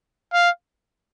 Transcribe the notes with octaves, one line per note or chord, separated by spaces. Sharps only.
F5